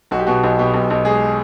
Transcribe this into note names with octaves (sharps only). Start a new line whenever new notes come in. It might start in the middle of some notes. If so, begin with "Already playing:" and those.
B1 F#4
G4
B2 F#4
B1
B2 G4
B1
B1
G#3 G#4